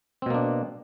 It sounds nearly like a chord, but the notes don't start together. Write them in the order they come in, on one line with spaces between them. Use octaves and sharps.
C4 B2 A#3 D4